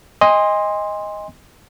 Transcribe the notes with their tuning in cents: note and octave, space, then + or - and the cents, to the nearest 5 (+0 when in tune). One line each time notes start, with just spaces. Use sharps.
D#5 +10 G#5 -35 C6 +5